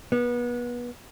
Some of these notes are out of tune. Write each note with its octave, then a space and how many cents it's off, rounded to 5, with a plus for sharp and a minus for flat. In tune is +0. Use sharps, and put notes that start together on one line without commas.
B3 -30